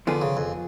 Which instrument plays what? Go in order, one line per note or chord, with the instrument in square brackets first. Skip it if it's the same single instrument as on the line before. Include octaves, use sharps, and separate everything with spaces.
[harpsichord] D3 [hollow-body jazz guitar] F3 B3 F4 G#4
[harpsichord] C#3
F2